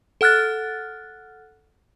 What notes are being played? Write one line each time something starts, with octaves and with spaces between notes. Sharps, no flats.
A4 F#5 F6 F#6 A6